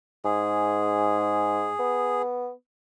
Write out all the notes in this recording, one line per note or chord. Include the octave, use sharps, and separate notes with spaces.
G#2 G#4
B3